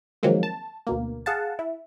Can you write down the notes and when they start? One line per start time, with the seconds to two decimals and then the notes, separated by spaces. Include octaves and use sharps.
0.23 D#3 F3 F#3 G#3 A#3 C4
0.43 A5
0.87 D2 B2 A#3
1.26 G#4 F5 F#5 A5
1.59 E4